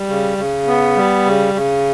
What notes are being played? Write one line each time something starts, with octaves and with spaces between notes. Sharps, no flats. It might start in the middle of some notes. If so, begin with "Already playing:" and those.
Already playing: G3
C#3
C#3
B3
G3
C#3
C#3